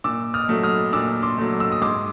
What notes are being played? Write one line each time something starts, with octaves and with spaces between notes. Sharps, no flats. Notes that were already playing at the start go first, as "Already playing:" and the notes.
A#2 D6 E6
D#6 F6
F#3 A3
D#6 F6
A#2 D6 E6
C6 D6
F#3 A3
E6
D#6
G#2 C6 D6